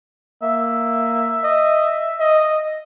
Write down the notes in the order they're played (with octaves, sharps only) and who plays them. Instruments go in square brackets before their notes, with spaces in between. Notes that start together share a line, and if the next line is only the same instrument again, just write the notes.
[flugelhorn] A#3 [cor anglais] E5
[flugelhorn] D#5
D#5